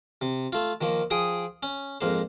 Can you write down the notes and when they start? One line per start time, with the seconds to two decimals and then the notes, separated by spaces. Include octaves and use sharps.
0.21 C3
0.52 A3 F4
0.81 D#3 F3 A#3
1.10 F3 G#4 G5 D#6
1.63 C#4
2.01 F2 G#2 A#3 C5